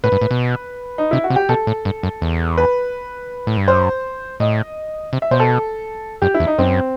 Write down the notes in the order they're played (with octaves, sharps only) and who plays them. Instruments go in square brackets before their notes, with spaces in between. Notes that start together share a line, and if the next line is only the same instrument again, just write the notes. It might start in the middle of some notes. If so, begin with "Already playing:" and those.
[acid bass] A2 [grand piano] B4
[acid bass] G2
A2
B2
[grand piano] D#4
[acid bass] C3 [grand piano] E4
[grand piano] F#4
[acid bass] C3
[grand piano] G4
[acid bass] B2 [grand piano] A4
[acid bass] A2
G2
F#2
E2
[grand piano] B4
[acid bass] A2
G2
[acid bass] F#2 [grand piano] C5
[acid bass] A2 [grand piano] D#5
[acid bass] C3
[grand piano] E5
[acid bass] B2 [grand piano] C5
[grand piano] A4
[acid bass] F#2 [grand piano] G4
[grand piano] E4
[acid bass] E2
[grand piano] D#4
[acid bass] F#2 [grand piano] C4